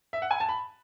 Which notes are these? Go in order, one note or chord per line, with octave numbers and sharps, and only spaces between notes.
E5
F#5
G#5
A5
B5